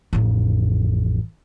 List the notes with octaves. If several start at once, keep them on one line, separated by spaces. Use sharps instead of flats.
A1 F2